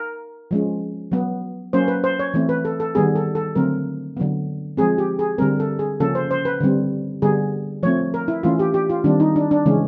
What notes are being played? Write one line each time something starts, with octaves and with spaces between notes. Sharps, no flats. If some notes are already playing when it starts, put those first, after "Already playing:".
Already playing: A#4
F3 G#3 C#4
F#3 B3
F#3 A#3 C#4 C5
B4
C5
C#5
E3 A3 C4
B4
A4
A4
D#3 G3 B3 G#4
A4
A4
D3 F#3 A3 C4 A#4
D3 F#3 B3
F3 G#3 C4 G#4
G4
G#4
D3 G3 C4 A#4
A4
G#4
C#3 F3 A#3 C#4 A4
C5
C5
B4
D3 G3 C4
D3 G3 B3 G#4
F3 A3 C4 C#5
A#4
E4
E3 A3 C#4 F4
G4
G4
F4
D#3 G3 C4 D4
D#4
D4
D4
C#3 E3 G#3 C#4